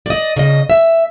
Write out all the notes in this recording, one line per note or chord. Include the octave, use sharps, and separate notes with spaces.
D5 D#5
C#3 D#5
E5